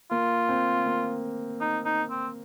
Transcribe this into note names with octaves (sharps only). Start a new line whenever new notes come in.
A#3 F4
C4
A#3
D#4
D#4
C4